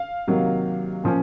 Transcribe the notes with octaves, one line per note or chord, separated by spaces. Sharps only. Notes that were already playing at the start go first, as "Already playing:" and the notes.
Already playing: F5
C3 D#3 F#3 A#3
A#2 F3 A#3 C#4